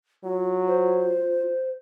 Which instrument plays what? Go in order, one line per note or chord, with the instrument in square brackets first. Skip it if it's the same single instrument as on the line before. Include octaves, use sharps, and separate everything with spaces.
[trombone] F#3 [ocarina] F4
[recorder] C5